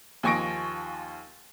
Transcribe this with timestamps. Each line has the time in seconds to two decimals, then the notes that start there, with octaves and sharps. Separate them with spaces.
0.23 D#2 F3 G#5 C#6 A#6 D7